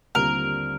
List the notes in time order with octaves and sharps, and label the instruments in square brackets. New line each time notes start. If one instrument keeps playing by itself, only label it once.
[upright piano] D#2 D3 G3 C4 F4 [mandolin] A#4